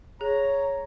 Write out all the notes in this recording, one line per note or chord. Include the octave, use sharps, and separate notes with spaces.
G#4 C#5 A#5